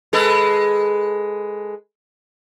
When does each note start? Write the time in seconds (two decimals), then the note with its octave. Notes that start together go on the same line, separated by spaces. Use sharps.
0.13 G#3 A4 B4